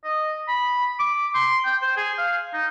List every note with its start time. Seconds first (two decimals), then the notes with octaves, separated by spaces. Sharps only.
0.04 D#5
0.48 B5
0.99 D6
1.35 C6
1.65 G5
1.82 C5
1.97 G#4
2.18 F5
2.53 D#4